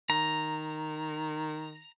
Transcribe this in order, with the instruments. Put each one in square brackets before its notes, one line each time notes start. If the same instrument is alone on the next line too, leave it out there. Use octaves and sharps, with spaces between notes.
[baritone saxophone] D#3 [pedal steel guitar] A#5